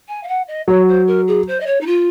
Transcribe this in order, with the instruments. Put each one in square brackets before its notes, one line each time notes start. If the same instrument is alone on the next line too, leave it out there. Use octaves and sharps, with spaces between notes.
[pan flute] G#5
F5
F#5
D#5
[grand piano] F#3 [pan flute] C#5
[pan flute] C5
A#4
G#4
C5
D#5
C#5
D#4
F4